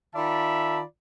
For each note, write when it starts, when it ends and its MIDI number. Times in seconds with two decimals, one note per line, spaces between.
0.15 0.81 51
0.15 0.81 65
0.15 0.81 74
0.15 0.81 76
0.15 0.81 81
0.15 0.81 83